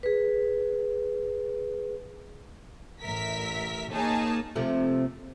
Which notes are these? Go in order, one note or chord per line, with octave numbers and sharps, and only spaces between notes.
G#4 B4
A1 A#4 E5 B6
A#3 D#4 G#4 C#5 A5
C3 F3 A3